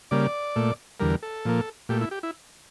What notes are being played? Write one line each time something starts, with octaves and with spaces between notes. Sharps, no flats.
C#3 G3 A#3 D5
A#2 A3
E2 D3 G3 A#4
A4
A#2 F3 A#3
A#2 A3 G4
E4
G4
E4